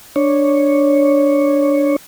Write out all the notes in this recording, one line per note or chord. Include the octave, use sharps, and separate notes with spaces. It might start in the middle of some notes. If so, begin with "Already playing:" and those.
D4 C#5